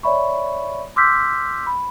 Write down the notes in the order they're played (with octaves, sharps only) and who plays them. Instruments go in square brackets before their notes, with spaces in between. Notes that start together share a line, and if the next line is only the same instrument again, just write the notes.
[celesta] C#5 D5 E5 B5 C#6
C6 D6 E6 F6 G6 B6
B5